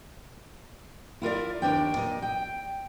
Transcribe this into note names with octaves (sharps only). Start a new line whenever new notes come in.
E4 F4 A#4 D5
D#2 F3 D4 G5
A#2 D#5
G5